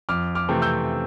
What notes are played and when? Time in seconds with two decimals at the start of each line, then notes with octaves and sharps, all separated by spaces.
0.09 F2 D6 F6
0.35 D6 F6
0.49 C3 E3 A3 C4
0.62 E6 G6